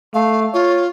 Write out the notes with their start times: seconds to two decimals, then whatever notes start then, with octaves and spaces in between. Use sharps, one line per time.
0.14 A3 F5
0.54 F4 C#5